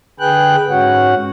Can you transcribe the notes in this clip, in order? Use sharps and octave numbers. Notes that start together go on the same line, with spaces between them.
D3 G#4 B4 G5 F#6
G#2 C#4 F#4 F#5